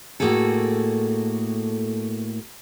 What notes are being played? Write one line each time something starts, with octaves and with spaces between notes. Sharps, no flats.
A2 A#3 F#4 G#4 A4